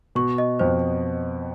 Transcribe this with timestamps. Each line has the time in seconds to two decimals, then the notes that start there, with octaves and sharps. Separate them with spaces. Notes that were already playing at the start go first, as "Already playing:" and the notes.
0.15 B2 C#6
0.38 D#5
0.59 F2 C5